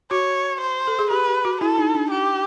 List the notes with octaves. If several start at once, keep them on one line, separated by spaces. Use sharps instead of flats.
F#4 C#5
C5
A4
G#4
G4 B4
G4
F#4
E4 A4
D#4
D4
G4